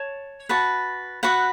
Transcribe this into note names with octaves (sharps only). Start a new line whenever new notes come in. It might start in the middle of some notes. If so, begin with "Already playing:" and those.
Already playing: C#5 A5
F#4 B4 A5
F#4 B4 F#5